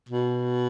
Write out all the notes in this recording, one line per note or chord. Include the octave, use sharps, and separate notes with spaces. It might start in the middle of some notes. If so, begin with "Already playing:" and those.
B2